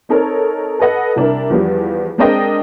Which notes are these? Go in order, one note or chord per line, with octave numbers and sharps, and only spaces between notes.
C4 D#4 A4 A#4 C#5
A4 B4 D#5 F#5
C2 D4 E4 A#4
E2 F3 G3
G#3 C4 D4 A#4 D#5 G5